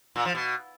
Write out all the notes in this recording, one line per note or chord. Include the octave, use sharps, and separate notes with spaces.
A#2
F3
B2